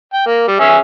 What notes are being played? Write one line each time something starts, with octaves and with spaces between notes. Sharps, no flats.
G5
A#3
G3
C#4 G#4 E5